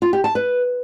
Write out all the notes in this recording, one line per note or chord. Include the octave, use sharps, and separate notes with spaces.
F4
G4
A5
B4